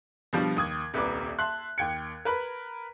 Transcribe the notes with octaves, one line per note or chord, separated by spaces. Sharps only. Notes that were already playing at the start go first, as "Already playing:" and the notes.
B2 F3 G3 D4
D#2 D#6 G#6
D#1 C2 B4 A#5 D6
E5 A5 C6 F#6
D#2 G5 G#6 C#7
A#4 B4 B5